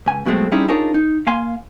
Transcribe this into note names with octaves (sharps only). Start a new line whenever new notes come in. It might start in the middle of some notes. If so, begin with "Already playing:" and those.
C#2 G#5
G2 B2 F#3 G#3 A3 C4
G3 C4 C#4 D#4 E4 G#4
D4 D#4 F4 G#4 A#4 C#5
D#4
A#3 F5 G#5 C6